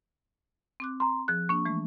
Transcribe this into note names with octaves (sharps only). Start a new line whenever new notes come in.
C4 D6 F#6
A#5 C6
F3 G#4 F#6
A#3 D4 C#6
E3 G#3 A3